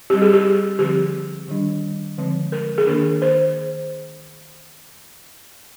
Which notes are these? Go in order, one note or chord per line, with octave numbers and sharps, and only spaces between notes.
G3 C4 G4
G#4
G4
D3 F3 C4 G4
D#3 G3 D4
D3 F3 G#3 C4
A#4
G#4
D#3 A#3 D4 A#4
C5